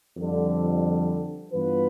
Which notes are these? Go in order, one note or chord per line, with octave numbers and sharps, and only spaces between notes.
F2 D3 G3
G2 E3 B3 F4 B4